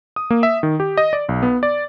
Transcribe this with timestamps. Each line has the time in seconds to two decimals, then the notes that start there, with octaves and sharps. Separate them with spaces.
0.16 D#6
0.30 A#3
0.43 E5
0.63 D#3
0.80 G4
0.97 D#5
1.13 D5
1.29 B1
1.43 B3
1.63 D5